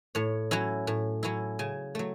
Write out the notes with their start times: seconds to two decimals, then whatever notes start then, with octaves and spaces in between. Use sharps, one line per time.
0.15 A2 C#5
0.51 F#3 C#4 E4
0.87 A2
1.23 F#3 C#4 E4
1.59 C#3 G#5
1.95 F#3 A3